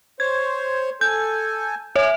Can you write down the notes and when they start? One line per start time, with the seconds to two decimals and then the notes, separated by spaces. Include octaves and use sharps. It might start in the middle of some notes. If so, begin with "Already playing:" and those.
0.20 C5 C#5 G#6
1.01 A4 G#5 G6
1.96 C#5 E5 G#5